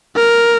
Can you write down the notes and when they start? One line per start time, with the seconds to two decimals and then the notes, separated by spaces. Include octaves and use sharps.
0.16 A#4